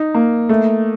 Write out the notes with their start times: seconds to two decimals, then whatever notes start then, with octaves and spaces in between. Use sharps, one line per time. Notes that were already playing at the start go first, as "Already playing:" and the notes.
Already playing: D#4
0.14 A#3
0.49 A3